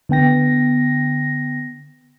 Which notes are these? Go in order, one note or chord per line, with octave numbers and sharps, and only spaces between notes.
D3 B3 G5 A#6